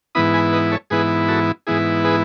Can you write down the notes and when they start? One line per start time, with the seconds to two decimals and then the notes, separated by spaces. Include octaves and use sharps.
0.15 G#2 E3 B3 E4 B5 D#6
0.34 G#5 B5
0.53 B4 D#5
0.71 A4 C#5
0.90 G#2 E3 B3 E4 G#4 B4
1.28 F#4 A4
1.67 G#2 E3 B3 E4 G#4
2.04 G#4 B4